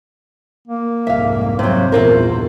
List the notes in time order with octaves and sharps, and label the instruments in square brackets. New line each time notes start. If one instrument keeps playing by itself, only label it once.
[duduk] A#3
[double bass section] C2 F2 G#2 [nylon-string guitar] E5 F5
[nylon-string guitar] C3 F#3 [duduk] C5
[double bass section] A#1 E2 G2 [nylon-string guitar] E4 F4 A#4